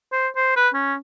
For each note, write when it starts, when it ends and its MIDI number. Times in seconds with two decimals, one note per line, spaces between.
0.12 0.28 72
0.36 0.53 72
0.56 0.69 71
0.74 0.95 61